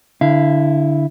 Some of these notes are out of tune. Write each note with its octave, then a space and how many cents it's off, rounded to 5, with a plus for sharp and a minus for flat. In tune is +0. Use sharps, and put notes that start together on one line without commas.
D3 -5 E4 +0 F5 -25